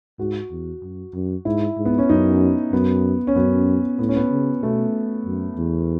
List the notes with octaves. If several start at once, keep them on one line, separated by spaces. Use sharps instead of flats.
G#2 F#4
E2
F#2
F#2
G#2 E4
G#2
B3
C#4
F#2 D#4
F#2 B3
C#4
F#2 B3
A2 B3
C#4
B3
C#3
B2 A3
F#2
E2